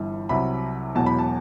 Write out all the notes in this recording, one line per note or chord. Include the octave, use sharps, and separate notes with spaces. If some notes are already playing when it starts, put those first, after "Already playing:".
Already playing: G1 G2 E3
C2 C3 F#3 B5
E1 E2 B2 F#3 A5
B5
A5